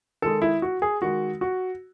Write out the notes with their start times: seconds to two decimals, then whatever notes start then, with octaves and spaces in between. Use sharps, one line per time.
0.22 D#3 G#3 A4
0.42 E4
0.62 F#4
0.82 G#4
1.02 D#3 G#3 F#4
1.41 F#4